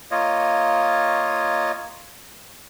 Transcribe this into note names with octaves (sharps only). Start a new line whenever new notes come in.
A#3 F4 C#5 D#5